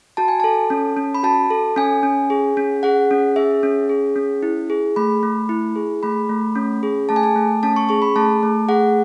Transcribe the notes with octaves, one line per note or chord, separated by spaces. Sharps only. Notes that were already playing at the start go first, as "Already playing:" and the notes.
F#4 A5
G#5
A4 A5
C#4
C#4
B5
F#4 A5
A4
C#4 G#5
C#4
G#4
C#4
G#4 F#5
C#4
G#4 E5
C#4
G#4
C#4
E4
G#4
A3 B5
A3
E4
G#4
A3 B5
A3
C#4
G#4
A3 A5
G#5
A5
A3
C#4 A5
C#6
G#4 C#6
B5
A3 A5
A3
G#4 F#5